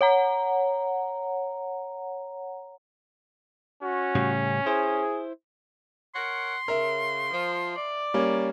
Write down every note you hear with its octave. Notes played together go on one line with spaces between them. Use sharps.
C#5 F#5 A#5
C#4 F#4
A2 C#3 G3
E4 G#4 C5
A#4 C#5 F#5 C6
C#3 A#4 E5
F3
D5
G3 A#3 C#4